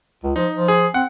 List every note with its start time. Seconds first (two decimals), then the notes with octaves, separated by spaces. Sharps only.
0.23 C#2
0.36 F3 D#4
0.53 F3
0.68 G#4
0.94 C4 F#5